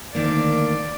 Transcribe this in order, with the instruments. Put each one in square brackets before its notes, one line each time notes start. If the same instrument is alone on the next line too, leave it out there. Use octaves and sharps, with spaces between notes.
[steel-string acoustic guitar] D2 D#3 A#3 [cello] D5